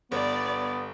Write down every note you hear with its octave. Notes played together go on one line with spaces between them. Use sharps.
G1 B3 D5